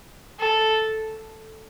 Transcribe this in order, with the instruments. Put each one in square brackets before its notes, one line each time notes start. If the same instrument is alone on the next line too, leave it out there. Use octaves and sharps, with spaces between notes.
[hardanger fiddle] A4